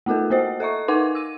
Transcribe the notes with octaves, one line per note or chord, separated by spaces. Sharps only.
A3 B3 F4 A4 A#4
A#3 F#4 C5 D#5
A4 D#5 E5 C#6
D#4 A#4 B4 F#5 G#5 D6
E6 D#7